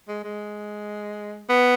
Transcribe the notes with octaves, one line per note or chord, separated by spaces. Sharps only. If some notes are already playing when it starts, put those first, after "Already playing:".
G#3
G#3
B3